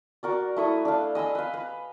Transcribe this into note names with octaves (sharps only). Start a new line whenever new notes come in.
F#4 A#4 D5
A3 E4 C#6 D#6
D4 A4 F5
D#5 G#5 B5 E6
B4 F5
B4